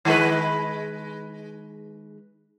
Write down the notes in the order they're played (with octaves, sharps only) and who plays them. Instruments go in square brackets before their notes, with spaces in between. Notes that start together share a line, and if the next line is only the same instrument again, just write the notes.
[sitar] D#3 G#3 B4